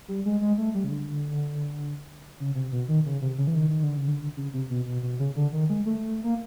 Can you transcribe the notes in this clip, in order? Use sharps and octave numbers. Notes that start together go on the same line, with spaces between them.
G3
G#3
G#3
A3
G3
C#3
D3
C#3
C3
B2
D#3
C#3
C3
C#3
E3
D#3
D#3
D3
C#3
D3
C#3
C3
B2
B2
B2
C#3
D3
D#3
G#3
A3
A#3